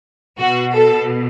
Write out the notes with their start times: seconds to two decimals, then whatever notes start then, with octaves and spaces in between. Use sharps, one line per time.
0.38 B2 F#4
0.75 A4